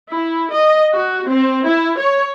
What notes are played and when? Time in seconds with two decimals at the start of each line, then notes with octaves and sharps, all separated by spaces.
0.12 E4
0.53 D#5
0.93 F#4
1.27 C4
1.65 E4
1.98 C#5